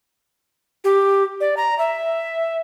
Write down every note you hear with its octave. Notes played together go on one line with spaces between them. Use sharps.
G4
D5
A#5
E5